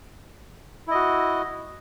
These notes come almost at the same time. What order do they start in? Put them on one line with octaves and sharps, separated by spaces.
E4 D#5 F#4